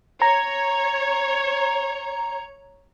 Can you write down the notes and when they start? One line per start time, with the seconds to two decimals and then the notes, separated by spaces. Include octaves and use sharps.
0.22 C#5 A#5